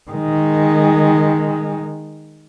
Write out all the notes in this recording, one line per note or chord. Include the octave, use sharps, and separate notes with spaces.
D#3 G#3